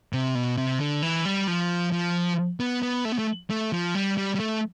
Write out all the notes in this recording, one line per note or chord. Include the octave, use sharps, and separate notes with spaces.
C3
B2
C3
D3
E3
G3
F3
F3
B3
B3
A3
B3
A3
A3
F3
G3
G3
G3
A3